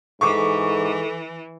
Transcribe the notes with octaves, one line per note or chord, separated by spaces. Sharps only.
G#2 E3 A4 C#6 D6